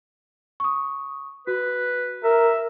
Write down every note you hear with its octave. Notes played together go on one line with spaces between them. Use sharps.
C#6 D#6
F#4 B4
A#4 E5